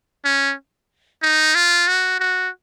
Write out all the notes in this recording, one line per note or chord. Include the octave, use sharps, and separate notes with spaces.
C#4
D#4
F4
F#4
F#4